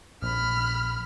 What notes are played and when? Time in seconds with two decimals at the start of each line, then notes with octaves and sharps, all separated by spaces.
0.22 A#1 B5 F6